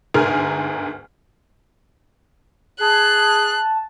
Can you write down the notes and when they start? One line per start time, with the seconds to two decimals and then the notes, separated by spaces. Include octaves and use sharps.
0.14 G1 D2 G#2 G#4 A#4 F6
2.81 G#4 A5 F#6